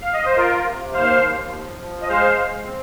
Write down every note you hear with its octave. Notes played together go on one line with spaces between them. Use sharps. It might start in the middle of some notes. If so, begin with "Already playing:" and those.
F5
D#5
C5
F4 A#4
C3
D#2 C5 F5
D#2
F3
F3
D#5
G#3 C5 F5
G#3
C4